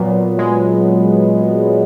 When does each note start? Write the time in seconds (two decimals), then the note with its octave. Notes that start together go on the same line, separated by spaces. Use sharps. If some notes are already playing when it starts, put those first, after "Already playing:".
Already playing: A#2 F#3 B3
0.39 G#3